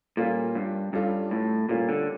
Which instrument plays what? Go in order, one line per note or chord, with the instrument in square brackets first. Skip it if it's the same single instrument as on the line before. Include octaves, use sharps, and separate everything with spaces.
[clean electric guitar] A#2 [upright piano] G3 C#4 F4 A4
[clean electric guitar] G2
[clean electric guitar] G2 [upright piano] G3 C#4 F4 A4
[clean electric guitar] A2
[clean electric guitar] A#2 [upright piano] G3 C#4 F4 A4
[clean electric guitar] D3